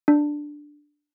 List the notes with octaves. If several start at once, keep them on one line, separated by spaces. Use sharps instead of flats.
D4